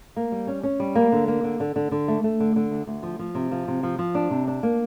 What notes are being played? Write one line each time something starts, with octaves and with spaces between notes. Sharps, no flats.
A#3
G3
C#4
C#4
G3
A#3
D3
A#3
D3
D3
D3
D3
A3
A3
D3
D3
D2
D2
F3
F3
C3
F3
C3
F3
F3
D4
C3
D4
A#3